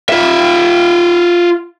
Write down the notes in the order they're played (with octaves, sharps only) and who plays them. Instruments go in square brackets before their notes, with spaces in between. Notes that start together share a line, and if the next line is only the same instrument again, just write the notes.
[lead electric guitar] F4 E5